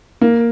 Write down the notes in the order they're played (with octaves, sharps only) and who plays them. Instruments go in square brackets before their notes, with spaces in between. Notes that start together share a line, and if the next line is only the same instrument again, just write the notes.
[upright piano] A#3